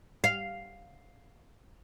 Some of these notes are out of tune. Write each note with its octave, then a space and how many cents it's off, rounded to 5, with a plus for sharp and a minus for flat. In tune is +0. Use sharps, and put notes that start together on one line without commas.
F5 +0